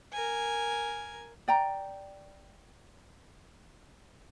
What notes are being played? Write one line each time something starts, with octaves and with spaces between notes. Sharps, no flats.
A#4 G#5
D5 G5 A#5